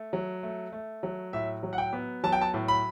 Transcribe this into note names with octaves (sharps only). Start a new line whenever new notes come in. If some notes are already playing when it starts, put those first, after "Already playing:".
Already playing: A3
F#3
A3
A3
F#3
A2 E5
F#3
F#5
G5
B3
F#3 A5
G5
A5
A2
B5